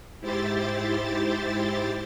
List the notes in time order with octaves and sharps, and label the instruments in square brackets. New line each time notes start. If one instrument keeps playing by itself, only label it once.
[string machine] G#2 E4 G4 C5 A6